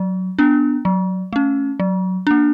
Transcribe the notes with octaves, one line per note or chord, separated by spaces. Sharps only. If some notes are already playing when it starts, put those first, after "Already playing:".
Already playing: F#3
B3 D4
F#3
A3 C#4
F#3
A#3 D4